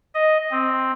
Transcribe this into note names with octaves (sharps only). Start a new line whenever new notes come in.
D#5
C4